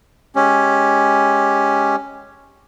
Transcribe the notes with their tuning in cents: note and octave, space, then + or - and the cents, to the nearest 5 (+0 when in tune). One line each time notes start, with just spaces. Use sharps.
G#3 +0 C#4 +0 G4 +0